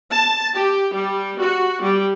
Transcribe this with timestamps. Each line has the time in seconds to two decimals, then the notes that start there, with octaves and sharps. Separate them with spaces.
0.10 A5
0.55 G4
0.94 G3
1.41 F#4
1.83 G3